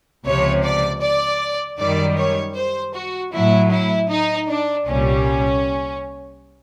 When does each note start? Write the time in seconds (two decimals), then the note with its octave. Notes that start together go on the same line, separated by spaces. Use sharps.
0.25 C#2 C3 F3 C#5
0.63 D5
1.02 D5
1.79 F#2 D#3 G3 D5
2.17 C#5
2.56 C5
2.95 F#4
3.33 A2 F#3 E4
3.72 E4
4.10 D#4
4.49 D4
4.87 C2 A#2 G3 C#4